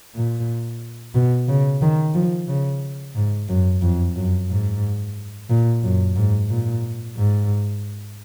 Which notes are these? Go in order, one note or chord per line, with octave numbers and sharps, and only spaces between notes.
A#2
B2
C#3
D#3
F3
C#3
G#2
F#2
F2
F#2
G#2
A#2
F#2
G#2
A#2
G#2